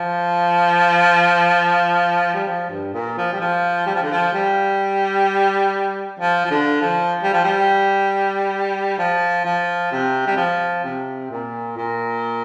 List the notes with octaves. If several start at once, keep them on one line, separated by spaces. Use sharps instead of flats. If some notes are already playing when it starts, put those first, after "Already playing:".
Already playing: F3
G3
F3
G2
A#2
F3
G3
F3
G3
F3
D3
F3
G3
F3
F3
D3
F3
G3
F3
G3
F3
F3
C3
G3
F3
C3
A#2
A#2